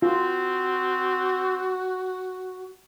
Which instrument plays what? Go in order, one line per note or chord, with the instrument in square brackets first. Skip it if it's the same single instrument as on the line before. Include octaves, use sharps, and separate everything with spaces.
[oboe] C4 [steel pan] F4 [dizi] F#4